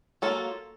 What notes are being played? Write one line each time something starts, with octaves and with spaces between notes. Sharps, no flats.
F#3 A#3 F4 A4